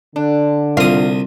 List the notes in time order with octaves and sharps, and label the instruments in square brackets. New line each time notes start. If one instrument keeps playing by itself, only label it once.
[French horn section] D3 [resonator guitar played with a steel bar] D4
[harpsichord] C2 D#6 [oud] F4